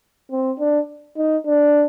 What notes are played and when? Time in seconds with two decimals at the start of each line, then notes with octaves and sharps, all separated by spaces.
0.31 C4
0.59 D4
1.17 D#4
1.46 D4